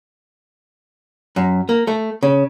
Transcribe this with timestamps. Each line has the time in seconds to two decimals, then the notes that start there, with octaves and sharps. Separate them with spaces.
1.36 F#2
1.69 A#3
1.87 A3
2.23 C#3